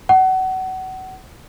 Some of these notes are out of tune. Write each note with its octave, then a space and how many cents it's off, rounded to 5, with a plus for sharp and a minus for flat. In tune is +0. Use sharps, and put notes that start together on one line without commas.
F#5 +25